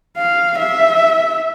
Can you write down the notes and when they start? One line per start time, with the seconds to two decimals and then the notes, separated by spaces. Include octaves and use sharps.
0.17 F5
0.59 E5